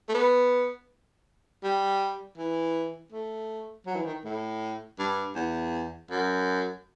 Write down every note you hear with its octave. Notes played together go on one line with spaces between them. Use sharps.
A3
B3
G3
E3
A3
F#3
E3
D#3
A2
G2
E2
F#2